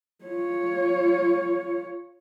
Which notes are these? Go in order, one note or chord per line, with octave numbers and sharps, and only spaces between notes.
F4 C#5